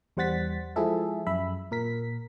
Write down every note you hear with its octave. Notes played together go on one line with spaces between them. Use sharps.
E2 G3 C5 F#5 A6 B6
F3 G#3 E4 G#4 A4 E5
F#2 E5 B5
A#2 A#4 B6